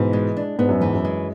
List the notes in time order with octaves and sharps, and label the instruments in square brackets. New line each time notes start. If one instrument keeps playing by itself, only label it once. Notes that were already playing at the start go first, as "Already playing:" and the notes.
Already playing: [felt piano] G#2 B2 [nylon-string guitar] E3
[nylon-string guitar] G#3
D4
[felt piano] G#2 [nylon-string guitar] B3
[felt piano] F#2
[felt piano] E2 G#2 [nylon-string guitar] E3
[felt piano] F#2
[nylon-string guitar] G#3